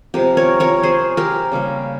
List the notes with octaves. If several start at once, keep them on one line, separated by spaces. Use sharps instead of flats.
C3 F3 G#3 G4 A#4
A#4 C#5
A#4 C#5
G#4 C5
G4 A#4
C#3 G3 A#3